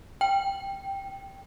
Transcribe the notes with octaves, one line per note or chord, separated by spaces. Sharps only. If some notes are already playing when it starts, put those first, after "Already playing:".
G5